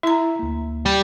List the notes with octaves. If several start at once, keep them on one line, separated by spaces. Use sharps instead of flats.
E4 E5 A#5
D2 A#3
G3